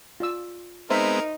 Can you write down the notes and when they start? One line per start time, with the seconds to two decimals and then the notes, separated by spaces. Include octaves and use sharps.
0.20 F4 D5 E6
0.90 G#3 B3 C4 D#4 A#4 C5 E5 B5